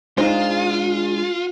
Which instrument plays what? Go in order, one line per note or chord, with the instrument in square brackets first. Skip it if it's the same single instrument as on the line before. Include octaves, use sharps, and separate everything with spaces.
[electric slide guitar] G#3 D4 G#4 [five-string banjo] D#4 C5 [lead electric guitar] F4